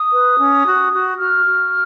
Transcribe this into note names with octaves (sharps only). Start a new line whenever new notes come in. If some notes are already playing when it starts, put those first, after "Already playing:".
Already playing: D#6
B4
C#4
F#4
F#4
F#4 F6
F#4